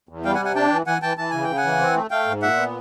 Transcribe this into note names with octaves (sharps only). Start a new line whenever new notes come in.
E2
G3 F5 G5
F#5 G#5
C3
F#5 G#5
D4 G5 A5
E3
E3 F#5 G#5
E3 G5 A5
E3 A5
C#3 G#5
G5
C#3
F#5 G#5
E3
C4
A3
A3 F5 G5
G#2
A#2 E5 F#5
B3